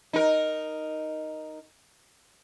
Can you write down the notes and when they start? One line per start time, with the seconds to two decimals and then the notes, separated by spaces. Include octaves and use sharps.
0.13 D#4 A#4